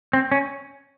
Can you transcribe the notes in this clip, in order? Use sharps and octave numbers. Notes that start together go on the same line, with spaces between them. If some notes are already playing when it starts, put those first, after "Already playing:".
C4
C#4